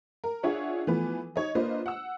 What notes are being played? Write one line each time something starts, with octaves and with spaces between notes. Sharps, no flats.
A#4
D4 F4 G#4 C#5 E5 F#5
E3 F3 A3 B3 B4
D#4 C#5 D#5
A#3 D4 F4 B4 C5 D#5
F#5 E6